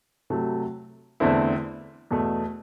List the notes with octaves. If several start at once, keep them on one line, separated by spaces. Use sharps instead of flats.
C3 F#3 A3
E2 D3 A3 C4 E4
E2 B2 A3